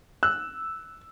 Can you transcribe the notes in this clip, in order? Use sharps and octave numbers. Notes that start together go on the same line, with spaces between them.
E6 F#6